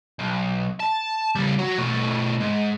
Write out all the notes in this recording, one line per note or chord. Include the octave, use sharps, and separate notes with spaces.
B1
A5
C#3 G3
F#4 C#5
B2 A3
G#2